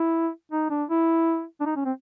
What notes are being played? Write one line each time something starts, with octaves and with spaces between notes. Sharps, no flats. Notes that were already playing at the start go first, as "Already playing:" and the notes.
Already playing: E4
D#4
D4
E4
D4
D#4
C#4
C4